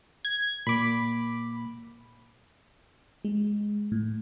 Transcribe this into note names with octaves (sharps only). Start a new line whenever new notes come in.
G#6
A#2 A#3 B5 D6
G#3
A2